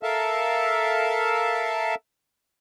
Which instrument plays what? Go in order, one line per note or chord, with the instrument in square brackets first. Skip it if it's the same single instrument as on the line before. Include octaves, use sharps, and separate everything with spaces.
[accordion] A4 A#4 E5 F5 A5